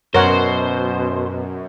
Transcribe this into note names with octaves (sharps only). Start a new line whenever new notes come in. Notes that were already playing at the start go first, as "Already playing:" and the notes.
F#2 B2 A#4 C5 C#5 F#5